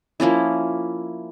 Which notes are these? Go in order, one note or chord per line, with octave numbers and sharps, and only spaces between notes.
F3 A#3 C#4 E4